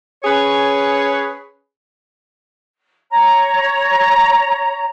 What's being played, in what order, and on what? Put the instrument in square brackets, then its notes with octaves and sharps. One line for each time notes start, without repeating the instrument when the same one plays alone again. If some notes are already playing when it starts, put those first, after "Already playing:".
[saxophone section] C#4 G#4 B4 C#5
[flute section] C#5 A#5